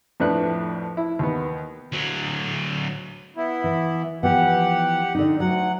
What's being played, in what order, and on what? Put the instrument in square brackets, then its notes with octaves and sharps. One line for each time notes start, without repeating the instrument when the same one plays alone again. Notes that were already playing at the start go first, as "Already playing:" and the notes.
[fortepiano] F2 A2 D4 B4 F#6
E4
D#2 B3
[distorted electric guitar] D2 F#3
[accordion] B3 E4
[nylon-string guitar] E3
[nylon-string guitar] E3 F3 B3 [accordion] G4 F#5
[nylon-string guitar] D3 D#4
[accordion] D2 F#5 [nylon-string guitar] F#3